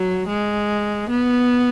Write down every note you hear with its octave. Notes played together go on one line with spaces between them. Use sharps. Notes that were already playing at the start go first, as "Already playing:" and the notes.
Already playing: F#3
G#3
B3